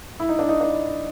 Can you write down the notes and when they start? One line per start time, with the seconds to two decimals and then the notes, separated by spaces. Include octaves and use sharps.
0.20 E4
0.29 D#4
0.39 D4
0.49 D#4
0.61 D4